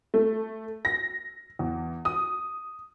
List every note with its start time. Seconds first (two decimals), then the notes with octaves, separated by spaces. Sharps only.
0.14 A3
0.85 A#6
1.59 E2
2.05 D#6